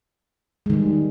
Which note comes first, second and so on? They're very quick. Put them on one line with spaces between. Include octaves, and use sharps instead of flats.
G#3 D#3 G3